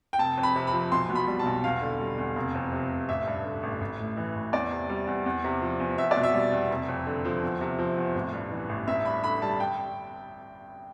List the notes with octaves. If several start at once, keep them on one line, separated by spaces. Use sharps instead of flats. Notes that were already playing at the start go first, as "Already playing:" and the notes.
G5
F1 A5
F2
B5
C3
B5
F3
B1 C6
B2
B5
G3
A5
B1
E2 F5
D3
G3
E2
F1
F2
C3
F1
A1 E5
G2
D3
A1
A1
A2
E3
A1
E2 D5
C3
G3
E2
E2
C3
F3
E2
E2 E5
D5
B2
E5
G3
E2
F1
F2
D3
F3
E2
C3
F3
E2
A1
G2
E3
A1
G1 E5
G2 B5
D3 B5
G3 A5
G5